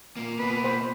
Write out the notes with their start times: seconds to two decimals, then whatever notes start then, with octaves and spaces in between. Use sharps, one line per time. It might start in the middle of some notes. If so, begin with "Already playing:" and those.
0.17 A#2 A#3
0.39 B2 A#3 B4
0.64 C5